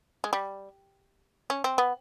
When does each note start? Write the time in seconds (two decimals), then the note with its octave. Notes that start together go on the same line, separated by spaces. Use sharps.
0.24 G#3
0.33 G3
1.50 C#4
1.64 C4
1.78 B3